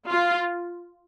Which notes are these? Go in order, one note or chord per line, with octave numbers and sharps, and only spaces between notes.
F4